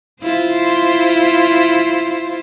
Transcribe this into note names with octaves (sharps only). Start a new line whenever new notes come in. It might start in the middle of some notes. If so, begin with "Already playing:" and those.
E4 F4 C5